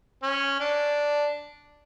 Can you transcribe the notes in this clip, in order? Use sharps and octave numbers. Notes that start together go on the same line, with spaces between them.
C#4
D4